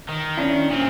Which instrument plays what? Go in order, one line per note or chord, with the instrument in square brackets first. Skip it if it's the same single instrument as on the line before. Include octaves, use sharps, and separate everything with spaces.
[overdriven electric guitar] D#3
[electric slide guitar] C#4 D4 E4
[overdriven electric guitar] A#2 C4 [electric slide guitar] C#4